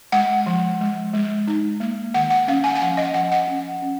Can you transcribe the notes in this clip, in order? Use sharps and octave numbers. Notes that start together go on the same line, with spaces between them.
G#3 F#5
F3
G#3
G#3
D#4
A#3
D#3 F#5
F#5
C#4 F5
G#5
G#5
F3 F#5
D#5
F3 F#5
F#5
C#4
C#4